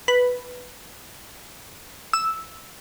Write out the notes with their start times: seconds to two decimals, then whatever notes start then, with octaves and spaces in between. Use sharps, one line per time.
0.08 B4
2.13 E6